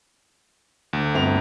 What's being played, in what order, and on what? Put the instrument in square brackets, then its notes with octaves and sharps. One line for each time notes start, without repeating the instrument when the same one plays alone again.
[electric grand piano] D2
[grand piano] G1 C4 F7